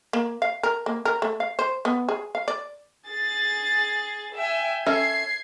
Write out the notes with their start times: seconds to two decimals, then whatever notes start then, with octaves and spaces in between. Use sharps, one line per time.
0.13 A#3
0.42 F5
0.63 A#4
0.86 A#3
1.05 A#4
1.22 A3
1.40 F5
1.59 C5
1.85 B3
2.09 G#4
2.35 F5
2.48 D5
3.07 G#4 A6
4.35 E5 G5 G#5
4.86 C#4 A4 E5 G#6 C7